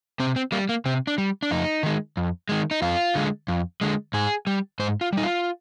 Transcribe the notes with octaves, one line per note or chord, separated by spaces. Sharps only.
C3 C4
C4
G3 A#3
A#3
C3 C4
D4
G3
D4
F2 D#4
D#3 G#3
F2
D#3 G#3
D#4
F2 F4
D3 G#3
F2
D3 G#3
G#2 G#4
G3
G#2 C5
F4
G3 D#4
F4